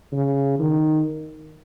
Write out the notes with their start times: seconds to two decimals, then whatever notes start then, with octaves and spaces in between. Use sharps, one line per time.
0.12 C#3
0.59 D#3